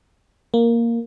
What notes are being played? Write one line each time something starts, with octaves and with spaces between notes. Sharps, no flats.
A#3